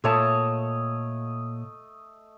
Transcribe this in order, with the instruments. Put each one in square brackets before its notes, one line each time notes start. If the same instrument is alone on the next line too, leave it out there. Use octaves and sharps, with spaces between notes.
[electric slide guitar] A#2 C#5 A5 [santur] A3 D#5 D#6